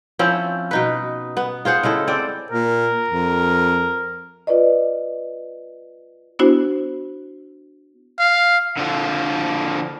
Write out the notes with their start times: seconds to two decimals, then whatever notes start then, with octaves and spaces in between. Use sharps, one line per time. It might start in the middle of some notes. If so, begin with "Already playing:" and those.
0.19 F3 C4 C#4 E4
0.71 B2 D#4 B4
1.37 B3
1.65 F4 G#4 C5 F#5
1.83 C#3 G#3 E4 A4
2.07 C4 D5
2.51 A#2 A#4
3.08 F2
4.47 F4 B4 D5 D#5
6.39 B3 D4 E4 F#4 C5
8.19 F5
8.77 D3 F3